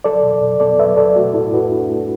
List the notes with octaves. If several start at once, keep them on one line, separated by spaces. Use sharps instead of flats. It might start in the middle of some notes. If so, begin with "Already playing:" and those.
F#3 A4 D5
B2
B2
B3 A4 D5
F#3 B4 E5
B2 A4 D5
A3 F#4
A2 E4 A4
A2 F#4 B4
D4
A3